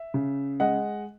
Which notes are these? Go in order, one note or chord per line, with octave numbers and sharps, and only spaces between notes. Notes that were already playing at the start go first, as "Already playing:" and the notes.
Already playing: E5
C#3
G#3 D#5 F#5